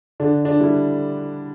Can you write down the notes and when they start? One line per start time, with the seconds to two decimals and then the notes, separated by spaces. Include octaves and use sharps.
0.20 D3 D4
0.45 D4
0.60 G3 E4